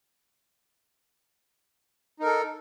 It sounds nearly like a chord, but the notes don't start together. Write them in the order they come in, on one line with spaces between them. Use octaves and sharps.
D#4 A#4 A4